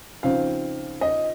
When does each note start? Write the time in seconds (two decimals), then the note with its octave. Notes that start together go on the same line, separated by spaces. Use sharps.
0.23 C#3 F3 C4 D#4 F5
1.01 D#5